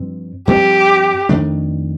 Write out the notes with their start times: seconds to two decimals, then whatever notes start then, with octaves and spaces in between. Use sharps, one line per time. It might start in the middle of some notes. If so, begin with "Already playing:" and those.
Already playing: G2 F3 C4
0.47 G2 F3 C4 G4
1.29 F2 D#3 A3 D4